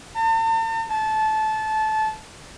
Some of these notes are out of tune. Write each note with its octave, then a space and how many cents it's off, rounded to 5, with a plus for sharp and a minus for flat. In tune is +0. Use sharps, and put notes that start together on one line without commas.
A5 +45
A5 -20